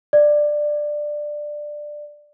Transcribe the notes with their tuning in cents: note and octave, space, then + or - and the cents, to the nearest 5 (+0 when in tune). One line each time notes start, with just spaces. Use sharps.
D5 +15